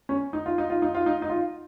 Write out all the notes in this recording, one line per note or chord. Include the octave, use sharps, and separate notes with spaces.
C#4
D#4
F4
D#4
F4
D#4
F4
D#4
D#4
F4